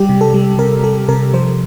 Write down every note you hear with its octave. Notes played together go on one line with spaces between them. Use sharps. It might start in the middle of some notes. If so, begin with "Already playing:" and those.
Already playing: G3 G4
C3
A4
G3
C3 A#4
G3 A4
C3 A#4
F3 C5